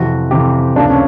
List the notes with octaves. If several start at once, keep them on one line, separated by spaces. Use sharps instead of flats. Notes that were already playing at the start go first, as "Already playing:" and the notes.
Already playing: F2 C3 E3 F#4
F2 C3 E3 G4
C#2 C3 F3 A#3 D4
C#4